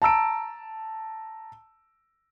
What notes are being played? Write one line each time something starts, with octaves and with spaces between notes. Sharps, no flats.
A5 A#5 E6 D7